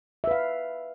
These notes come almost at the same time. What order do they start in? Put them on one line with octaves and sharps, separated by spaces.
E5 B4 F5